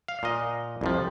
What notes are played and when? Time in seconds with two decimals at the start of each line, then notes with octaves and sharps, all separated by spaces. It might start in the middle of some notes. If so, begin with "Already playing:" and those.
0.08 F5
0.23 A#2 D#5
0.81 C2 F2 F3